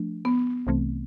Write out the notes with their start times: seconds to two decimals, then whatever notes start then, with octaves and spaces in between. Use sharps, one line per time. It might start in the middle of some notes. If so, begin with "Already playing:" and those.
Already playing: F3 A3 D4
0.25 B3
0.67 C2 C3 E3 A3 C4